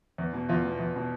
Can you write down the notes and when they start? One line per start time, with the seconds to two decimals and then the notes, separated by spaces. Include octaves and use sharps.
0.18 E2
0.34 B2
0.49 E2 F4
0.65 B2
0.80 E2
0.96 B2